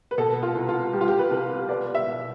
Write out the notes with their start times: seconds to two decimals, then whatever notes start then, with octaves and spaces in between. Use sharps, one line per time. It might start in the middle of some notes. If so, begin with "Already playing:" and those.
0.11 B4
0.18 B2 A4
0.43 F4
0.55 C2
0.69 F4
0.93 G3 G4
1.01 F4
1.08 G4
1.19 B4
1.31 C2
1.69 B3 D5
1.95 E5
2.06 B2